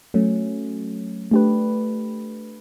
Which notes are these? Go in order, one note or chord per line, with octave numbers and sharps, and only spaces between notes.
F#3 A3 C#4
A3 D4 G4 B4